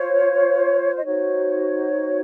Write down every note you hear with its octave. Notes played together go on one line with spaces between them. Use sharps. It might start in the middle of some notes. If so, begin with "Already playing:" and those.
Already playing: F4 C5 C#5
D#5
D#4 F#4 C5 C#5